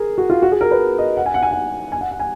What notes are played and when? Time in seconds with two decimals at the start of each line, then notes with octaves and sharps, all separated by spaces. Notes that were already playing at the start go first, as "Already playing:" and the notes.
Already playing: G#4 A#4
0.18 F#4
0.30 F4
0.42 F#4
0.52 G#4
0.61 A#4
0.71 B4
0.98 D#5
1.17 F#5
1.26 G#5
1.34 F#5
1.43 G#5
1.51 F#5
1.92 G#5
2.01 F#5
2.11 F#5
2.20 G#5